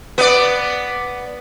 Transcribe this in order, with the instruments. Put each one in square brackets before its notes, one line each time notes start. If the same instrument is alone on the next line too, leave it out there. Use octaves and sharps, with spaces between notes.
[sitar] B3 D5